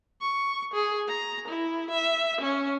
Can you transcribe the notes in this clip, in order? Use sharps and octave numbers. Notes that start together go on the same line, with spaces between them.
C#6
G#4
A#5
E4
E5
C#4